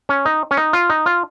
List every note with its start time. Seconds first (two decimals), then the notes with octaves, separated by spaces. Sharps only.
0.09 C#4
0.25 D#4
0.51 C#4
0.57 D#4
0.73 F4
0.90 D#4
1.06 F4